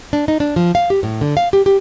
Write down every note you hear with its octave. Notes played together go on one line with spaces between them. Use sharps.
D4
D#4
D4
F3
F5
G4
A2
D3
F5
G4
G4